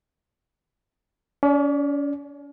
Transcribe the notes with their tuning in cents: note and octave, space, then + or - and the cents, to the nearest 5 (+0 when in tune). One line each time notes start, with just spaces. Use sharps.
C#4 +35 D5 +0